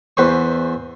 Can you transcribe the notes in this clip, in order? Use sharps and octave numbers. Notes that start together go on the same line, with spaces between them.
E2 B4 C5 C#6